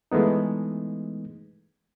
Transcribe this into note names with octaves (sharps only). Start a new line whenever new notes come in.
E3 G#3 A3 B3 D#4